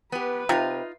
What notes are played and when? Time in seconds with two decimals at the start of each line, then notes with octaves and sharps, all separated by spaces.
0.12 B3 G4 B4
0.49 C3 D#4 F4